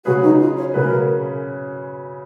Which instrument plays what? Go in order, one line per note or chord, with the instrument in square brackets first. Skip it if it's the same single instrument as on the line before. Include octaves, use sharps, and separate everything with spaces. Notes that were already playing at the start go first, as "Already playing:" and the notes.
[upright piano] C#3 F#3 C#4 G#4 B4 [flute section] F#4
[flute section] D#4
F4
C#5
[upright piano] C#3 F#3 C#4 G#4 B4 [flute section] A#4